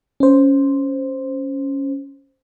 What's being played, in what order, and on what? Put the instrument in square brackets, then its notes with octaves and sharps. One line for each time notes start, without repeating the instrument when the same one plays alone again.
[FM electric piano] C#4 C5